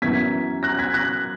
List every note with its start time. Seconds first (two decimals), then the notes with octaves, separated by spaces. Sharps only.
0.02 F#2 E3 B3 G#6 B6
0.63 F#6 A#6
0.79 G#6 B6
0.94 F#6 A#6